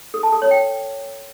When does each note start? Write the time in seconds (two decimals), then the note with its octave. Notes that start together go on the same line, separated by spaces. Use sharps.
0.14 A4
0.23 A5
0.32 A4
0.42 C#5
0.51 G5